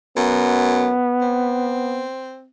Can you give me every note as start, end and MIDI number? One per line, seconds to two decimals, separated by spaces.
0.17 0.94 42
0.17 2.05 59
1.22 2.47 60